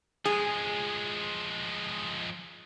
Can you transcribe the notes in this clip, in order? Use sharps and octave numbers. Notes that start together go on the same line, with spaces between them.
F3 G#3 G#4